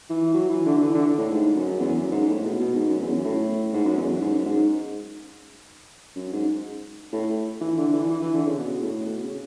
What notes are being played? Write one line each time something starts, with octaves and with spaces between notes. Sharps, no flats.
E3
F#3
E3
D3
E3
D3
A2
G#2
F#2
E2
F#2
G#2
A2
B2
B2
G#2
F#2
E2
F#2
A2
G#2
F#2
E2
F#2
G#2
F#2
G#2
F#2
G#2
A2
E3
D3
E3
E3
E3
D3
C#3
B2
A2
B2
C#3